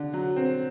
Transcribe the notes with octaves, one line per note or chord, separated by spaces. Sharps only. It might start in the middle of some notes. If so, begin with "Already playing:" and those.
Already playing: D3
F#3
C4